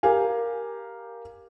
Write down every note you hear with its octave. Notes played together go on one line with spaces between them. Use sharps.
G4 A#4 F5 G#5